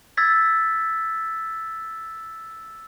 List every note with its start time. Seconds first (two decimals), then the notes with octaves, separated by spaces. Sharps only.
0.17 E6 G#6 A6 B6